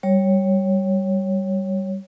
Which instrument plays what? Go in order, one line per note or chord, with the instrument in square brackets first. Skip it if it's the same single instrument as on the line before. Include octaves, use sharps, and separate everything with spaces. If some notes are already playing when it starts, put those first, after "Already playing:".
[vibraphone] G3 C#5